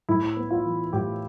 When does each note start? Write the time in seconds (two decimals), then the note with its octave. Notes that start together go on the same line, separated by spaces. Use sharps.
0.09 A2 E4
0.37 B3
0.51 F4
0.65 E3
0.93 A2 G4